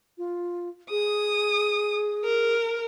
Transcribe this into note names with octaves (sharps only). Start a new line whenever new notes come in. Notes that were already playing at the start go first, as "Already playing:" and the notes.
F4
G#4 D#6
A#4